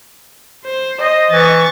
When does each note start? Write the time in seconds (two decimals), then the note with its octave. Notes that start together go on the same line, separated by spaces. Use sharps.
0.65 C5
0.99 D#5
1.31 E3 C#6 A6